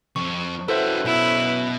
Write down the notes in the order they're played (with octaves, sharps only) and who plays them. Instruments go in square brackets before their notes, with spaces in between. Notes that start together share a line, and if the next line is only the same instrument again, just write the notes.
[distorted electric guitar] F2 [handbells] C#6
[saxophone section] F#2 F#3 B4 [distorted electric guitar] E4 F#4 [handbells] A4 C5 E5
[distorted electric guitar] B2 [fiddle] E4